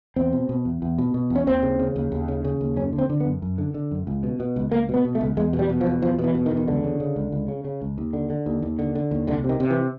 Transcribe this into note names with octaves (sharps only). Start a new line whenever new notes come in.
E2 C4
B2
B2
E2
E2
B2
B2
E2
C#4
D#2 C4
C#3
C#3
D#2
D#2
C#3
C#3
D#2
F#2 C#4
D3
C4
D3
B3
F#2
F#2
D3
D3
F#2
C#2
B2
B2
C#2
C#2 A#3
B2 B3
B2
A3
C#2
E2 G#3
B2
G3
B2
F3
E2
E2 F3
B2
E3
B2
D#3
E2
D#3
C#2 D3
C#3
C#3
C#2
C#2
C#3
C#3
C#2
D#2
D3
D3
D#2
D#2
D3
D3
D#2
C2 D3
C3
D#3
C3
E3